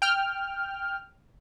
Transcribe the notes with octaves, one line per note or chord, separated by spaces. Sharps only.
G5 F6